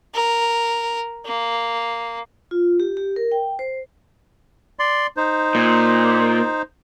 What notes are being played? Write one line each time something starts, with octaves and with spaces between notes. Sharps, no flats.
A#4
A#3
F4
G4
G4
A#4
G5
C5
D5 C6
D#4 C5
A#2